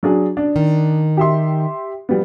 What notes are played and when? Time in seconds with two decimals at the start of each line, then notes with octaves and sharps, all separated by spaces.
0.03 F#3 D4 G#4
0.37 D4
0.56 D#3
1.17 G4 E5 C6
2.09 F3 G3 B3